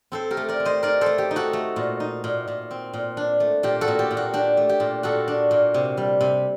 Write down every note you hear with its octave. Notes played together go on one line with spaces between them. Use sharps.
C4 A4 C5
G4 A#4
A3
A#4 D5
C4
C5 D#5
D#4 A#4 D5
A3 A4 C5
G4
D#4
F#4 A4
A3
A#2
D#4
A#2
A#2
C4
A#2
D4
A3
A#2 G4
F#4 A4
A#2
G4
A#2
F#4
D4 G4
A3
G4
A#2
A#2 F#4 A4
D4
A#2
C3
G3
C3